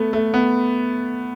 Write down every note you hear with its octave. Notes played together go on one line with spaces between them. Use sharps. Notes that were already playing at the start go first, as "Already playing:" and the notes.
Already playing: A3 B3
A3
B3